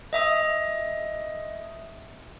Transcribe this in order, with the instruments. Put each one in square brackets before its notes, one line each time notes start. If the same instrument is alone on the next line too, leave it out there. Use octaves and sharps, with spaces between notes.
[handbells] D#5 E5 D#6